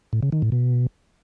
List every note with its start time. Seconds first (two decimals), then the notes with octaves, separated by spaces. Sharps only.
0.13 A2
0.23 C#3
0.32 D#3
0.42 A2
0.52 B2